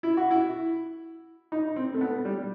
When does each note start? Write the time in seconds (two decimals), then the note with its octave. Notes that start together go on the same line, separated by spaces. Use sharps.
0.03 E4
0.17 F#4
0.31 E4
1.52 D#4
1.76 C4
1.94 A3
2.01 B3
2.25 G3